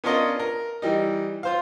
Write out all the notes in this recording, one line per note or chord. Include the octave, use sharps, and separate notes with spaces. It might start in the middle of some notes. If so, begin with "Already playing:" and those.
B3 C#4 D4 F4 A#4 D#5
A#4
E3 G3 D#4
F4 C5 F5